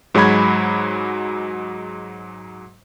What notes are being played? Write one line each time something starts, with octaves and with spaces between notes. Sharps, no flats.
G#2 F#3 G#3 F#4 B5 G#6